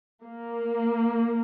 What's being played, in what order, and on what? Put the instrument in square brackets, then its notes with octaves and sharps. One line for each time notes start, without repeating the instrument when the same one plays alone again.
[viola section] A#3